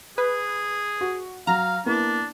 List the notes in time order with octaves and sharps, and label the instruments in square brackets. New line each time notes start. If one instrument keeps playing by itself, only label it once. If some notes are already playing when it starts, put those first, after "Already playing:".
[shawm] G#4 [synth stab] B4
[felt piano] F#4
[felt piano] F#3 [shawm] F5 [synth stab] A#5
[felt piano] A#3 B3 E4 [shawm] D4